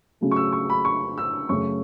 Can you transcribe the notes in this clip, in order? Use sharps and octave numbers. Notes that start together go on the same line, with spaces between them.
C#3 F#3 A3
C#6
E6
C#6
B5
C#6
E6
F#2 C#3 A3 C#6